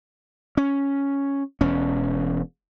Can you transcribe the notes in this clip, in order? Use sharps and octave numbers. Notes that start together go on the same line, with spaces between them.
C#4
E1 C#4